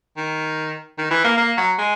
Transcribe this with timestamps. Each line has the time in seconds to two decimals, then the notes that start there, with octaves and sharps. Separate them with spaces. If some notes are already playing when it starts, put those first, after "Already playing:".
0.17 D#3
0.98 D#3
1.11 E3
1.24 A#3
1.37 A#3
1.57 F#3
1.78 G#3